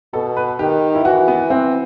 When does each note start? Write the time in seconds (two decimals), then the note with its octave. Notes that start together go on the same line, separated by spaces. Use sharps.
0.13 B2 A4
0.37 B4
0.59 D#3 G4
0.95 E4
1.05 E3 F#4
1.28 B3
1.50 C4